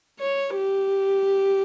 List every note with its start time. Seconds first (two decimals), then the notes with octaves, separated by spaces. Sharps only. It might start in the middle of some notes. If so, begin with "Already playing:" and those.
0.20 C#5
0.56 G4